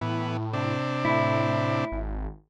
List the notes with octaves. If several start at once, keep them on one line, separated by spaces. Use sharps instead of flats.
A2 E3 B3
C3 D4
A2 E4
G#1